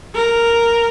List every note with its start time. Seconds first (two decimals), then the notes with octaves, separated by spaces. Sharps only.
0.15 A#4